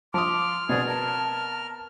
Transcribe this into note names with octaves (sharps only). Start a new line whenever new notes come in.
F3 C6 D6 D#6 F6
B2 B3 C4 G#4 D5
A#4 A5